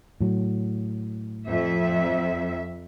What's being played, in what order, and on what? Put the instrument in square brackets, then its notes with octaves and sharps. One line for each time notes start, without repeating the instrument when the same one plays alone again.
[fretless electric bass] A2 F#3
[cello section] F2 E5